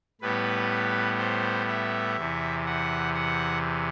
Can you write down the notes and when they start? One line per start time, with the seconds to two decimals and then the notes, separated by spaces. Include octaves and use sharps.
0.21 A2 G3 B3 B4
1.19 C5
1.68 E5
2.16 E2 C3 E3
2.66 F#5
3.14 F#5